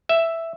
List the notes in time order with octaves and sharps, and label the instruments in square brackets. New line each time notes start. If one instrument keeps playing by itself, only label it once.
[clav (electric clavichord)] E5